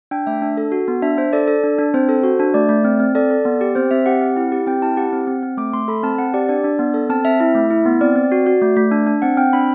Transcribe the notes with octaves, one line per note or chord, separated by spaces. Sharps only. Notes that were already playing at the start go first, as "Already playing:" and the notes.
D4 G5
A3 E5
D4
A4
F#4
B3
D4 E5
D4 C5
A4 D5
A4
D4
D4
C4 C5
A4
F#4
D4
A3 D5
A3
C4
C4
A4 D5
A4
B3
G4
C4 C5
C4 E5
G4 F#5
C4
E4
G4
C4 G5
E4 A5
G4 F#5
C4
C4
C4
A3 D6
A3 C6
A4 B5
C4 A5
C4 F#5
G4 D5
D4 D5
D4
B3
A4
C4 A5
C4 E5
E4 E5
A3
E4
B3
C4 D5
C4
F#4
F#4
A3
A3
D4
D4
C4 F#5
C4 G5
D4 B5